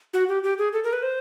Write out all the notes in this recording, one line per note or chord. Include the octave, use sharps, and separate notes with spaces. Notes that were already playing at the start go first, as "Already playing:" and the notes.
F#4
G4
G4
G#4
A4
A#4
B4
C5